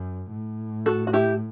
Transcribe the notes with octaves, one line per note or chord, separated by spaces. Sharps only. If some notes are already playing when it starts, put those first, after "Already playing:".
Already playing: F#2
A2
F#4 A4
F#4
E4 G4